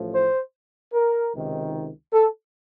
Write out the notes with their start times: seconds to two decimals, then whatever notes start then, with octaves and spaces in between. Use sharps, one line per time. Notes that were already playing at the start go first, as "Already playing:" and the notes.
Already playing: A1 A2 F3
0.13 C5
0.93 A#4
1.33 C#2 C3 D#3
2.13 A4